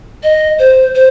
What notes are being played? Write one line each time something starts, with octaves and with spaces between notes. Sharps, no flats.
D#5
C5
C5